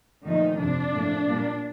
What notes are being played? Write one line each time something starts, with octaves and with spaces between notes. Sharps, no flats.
A#2 D#3 F3 A3 D#4
F2 C3 F3 D4
A2 F3 A#3
A#2 G3 A#3